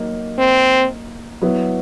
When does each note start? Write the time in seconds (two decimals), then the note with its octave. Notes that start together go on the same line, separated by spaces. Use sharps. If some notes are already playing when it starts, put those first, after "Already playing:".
Already playing: F#3 A#3 D#4
0.39 C4
1.42 F#3 B3 E4